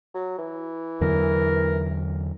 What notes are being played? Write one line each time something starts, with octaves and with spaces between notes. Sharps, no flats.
F#3
E3
E2 D3 F#3 A#4